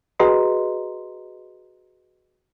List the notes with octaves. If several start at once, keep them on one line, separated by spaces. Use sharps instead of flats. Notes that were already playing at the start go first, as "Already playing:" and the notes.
F#4 G#4 B4 D#5 A#5 C6